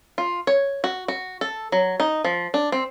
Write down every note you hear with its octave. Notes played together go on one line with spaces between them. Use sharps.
F4
C#5
F#4
F#4
A4
F#3
D#4
F3
D4
C4